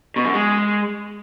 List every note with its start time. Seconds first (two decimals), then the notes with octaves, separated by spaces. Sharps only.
0.16 B2
0.25 F#2
0.33 G#3